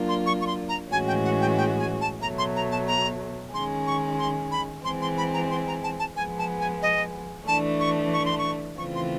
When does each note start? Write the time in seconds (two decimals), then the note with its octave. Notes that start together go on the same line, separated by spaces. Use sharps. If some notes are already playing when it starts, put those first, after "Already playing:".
Already playing: F#3 A#3 D4 F4
0.09 C6
0.26 C#6
0.41 C#6
0.47 C6
0.69 A#5
0.91 A2 E3 G#3 C#4 F#4 G#5
1.07 G5
1.25 F#5
1.41 G5
1.57 G5
1.79 G#5
2.01 A5
2.22 B2 F#3 A3 A#5
2.38 C6
2.56 A#5
2.71 A5
2.87 A#5
3.54 D#3 G#3 C#4 C6
3.87 C#6
4.19 C6
4.51 B5
4.84 E3 G#3 C4 C6
5.02 C6
5.18 B5
5.34 A#5
5.50 C6
5.67 A#5
5.83 A5
5.99 A5
6.16 F3 G#3 B3 G#5
6.38 A5
6.60 G#5
6.82 D#5
7.47 E3 A3 D4 A5
7.80 C#6
8.13 C#6
8.26 C6
8.38 C#6
8.78 C#3 E3 A3 C4 F4 C#6
8.95 C6